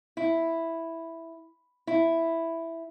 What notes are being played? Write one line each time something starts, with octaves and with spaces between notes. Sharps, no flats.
E4
E4